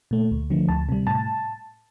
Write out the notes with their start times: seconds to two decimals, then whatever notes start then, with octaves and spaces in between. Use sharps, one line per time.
0.11 A#2 A3
0.31 D2
0.50 D3 F3 A3
0.69 D2 A5
0.89 C3 G3
1.07 A2 A5